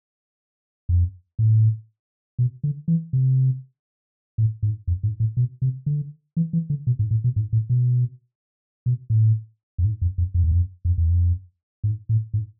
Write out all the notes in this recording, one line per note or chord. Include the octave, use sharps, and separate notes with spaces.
F2
A2
B2
D3
E3
C3
A2
G#2
F2
G#2
A2
B2
C3
D3
E3
E3
D3
B2
G#2
A2
B2
G#2
A2
B2
B2
A2
F2
G#2
F2
F2
F2
E2
F2
F2
E2
F2
G#2
A2
G#2